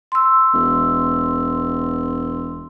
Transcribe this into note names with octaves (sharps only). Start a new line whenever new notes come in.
C6 E6
E1